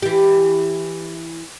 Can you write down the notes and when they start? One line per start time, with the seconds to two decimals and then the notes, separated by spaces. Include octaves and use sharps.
0.02 E3 G4